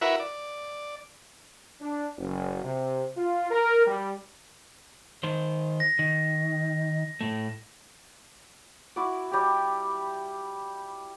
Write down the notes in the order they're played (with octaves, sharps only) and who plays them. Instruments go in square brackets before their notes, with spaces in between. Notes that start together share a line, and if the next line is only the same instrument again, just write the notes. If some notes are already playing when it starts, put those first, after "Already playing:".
[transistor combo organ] E4 F#4 A#4 B4 E5
D5
[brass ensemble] D4
F#1
C3
F4
A#4
G3
[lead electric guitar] D#3 C5
[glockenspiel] A#6
[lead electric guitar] D#3
A2 A3
[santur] E4 F#4 D5
G3 G4